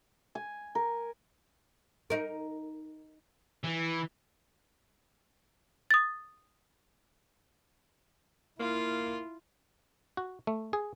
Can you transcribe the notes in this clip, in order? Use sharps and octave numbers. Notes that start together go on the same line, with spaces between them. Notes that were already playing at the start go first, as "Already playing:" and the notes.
G#5
A#4
D#4 A#4
E3
D#6 A6
A#3 E4 F4
F#4
A3
G#4